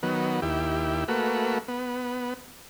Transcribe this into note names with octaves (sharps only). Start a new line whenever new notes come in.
D#3 F#3 B3
D#2 E4 G4
A3 A#3 F#4 B4
B3